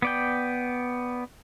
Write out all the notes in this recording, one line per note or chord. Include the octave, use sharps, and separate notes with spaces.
B3 D5 G5